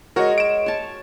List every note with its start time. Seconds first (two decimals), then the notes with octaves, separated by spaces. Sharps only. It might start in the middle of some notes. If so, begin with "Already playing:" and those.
0.16 G#3 F#4 A#4 C#5
0.38 D7 E7
0.66 C#5 A5